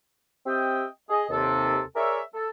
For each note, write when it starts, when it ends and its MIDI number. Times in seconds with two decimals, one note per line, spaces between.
0.46 0.86 60
0.46 0.86 67
0.46 0.86 75
0.46 0.86 76
0.46 0.86 79
1.10 1.24 68
1.10 1.24 75
1.30 1.81 39
1.30 1.81 48
1.30 1.81 69
1.96 2.20 68
1.96 2.20 70
1.96 2.20 73
1.96 2.20 74
1.96 2.20 76
2.34 2.49 69